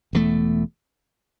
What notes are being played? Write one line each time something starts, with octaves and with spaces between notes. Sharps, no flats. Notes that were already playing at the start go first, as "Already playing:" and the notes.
E1 E2 D#3 A3